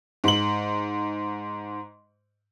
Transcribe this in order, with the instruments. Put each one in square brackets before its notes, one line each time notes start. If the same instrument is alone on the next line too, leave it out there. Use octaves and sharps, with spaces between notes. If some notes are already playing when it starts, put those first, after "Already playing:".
[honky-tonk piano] G#2 F#7